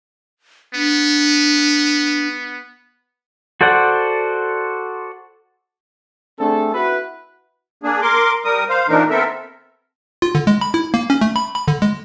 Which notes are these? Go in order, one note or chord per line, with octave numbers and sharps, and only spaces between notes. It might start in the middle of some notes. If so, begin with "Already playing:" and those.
B3 D4
F#4 A4 C5 D5 F#5
A3 C4 D4 G#4 A4
E4 F#4 B4
A#3 D4 G#4
A#4 C6 D6
G3 A#4 D#6
C5 F5
A#2 E3 A#3 D4 D#4 A#4
B3 C4 A4 A#4 E5
F4
D3
G#3
B5
E4
A#3
C#4
A3
B5
B5
D3
G#3